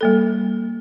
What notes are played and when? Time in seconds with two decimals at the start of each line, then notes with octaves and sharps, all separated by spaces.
0.01 G3 A#3 A4